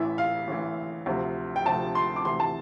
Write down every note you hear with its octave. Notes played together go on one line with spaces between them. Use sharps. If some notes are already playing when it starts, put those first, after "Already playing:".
Already playing: A1 A2 E3 E5
F5
A1 A2 E3
D2 C3 F3
G5
D2 C3 F3 A5
C6
D6
D2 C3 E3 C6
A5